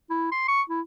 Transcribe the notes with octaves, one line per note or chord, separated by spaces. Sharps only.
E4
C6
C#6
E4